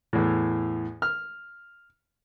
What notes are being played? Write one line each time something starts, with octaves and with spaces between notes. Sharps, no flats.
E2 A2
F6